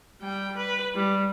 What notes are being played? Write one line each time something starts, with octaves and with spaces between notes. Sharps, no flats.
G3 G5
B4
G3